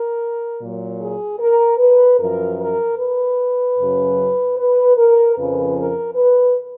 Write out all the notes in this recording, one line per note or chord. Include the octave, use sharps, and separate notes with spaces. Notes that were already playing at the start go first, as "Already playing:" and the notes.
Already playing: A#4
A#2 F#3
G#4
A#4
B4
F#2 F3 A#4
A#4
B4
F#2 C#3 F#3
B4
A#4
F2 C#3 F3 B4
A#4
B4